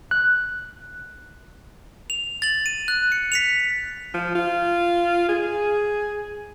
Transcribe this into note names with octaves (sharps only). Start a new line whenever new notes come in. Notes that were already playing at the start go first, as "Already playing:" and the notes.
F#6
F7
A6 F#7
D#7
F#6
C#7
B6 C#7 F7
F3
F4
G#4